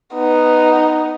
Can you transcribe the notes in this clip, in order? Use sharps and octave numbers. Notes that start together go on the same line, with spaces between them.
B3 D#4